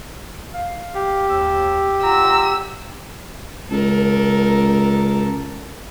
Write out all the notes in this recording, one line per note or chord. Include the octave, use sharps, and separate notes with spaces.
F5
G4
D#2 E6
F4 F#5 A#5 E6
C#2 A4 A#4